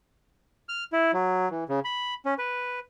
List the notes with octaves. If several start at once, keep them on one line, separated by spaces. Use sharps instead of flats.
F6
E4
F#3
E3
C#3
B5
C#4
B4